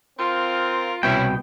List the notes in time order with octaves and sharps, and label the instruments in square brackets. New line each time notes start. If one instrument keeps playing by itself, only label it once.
[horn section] C4 F4 A#4
[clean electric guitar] C2 B2 G5 [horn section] C#4 E4